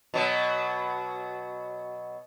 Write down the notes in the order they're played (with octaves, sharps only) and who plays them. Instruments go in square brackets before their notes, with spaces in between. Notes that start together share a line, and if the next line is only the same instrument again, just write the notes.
[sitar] B2 F#3